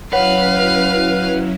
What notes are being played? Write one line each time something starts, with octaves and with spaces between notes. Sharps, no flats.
F#3 C#4 E4 B4 C#5 F5 F#5 F6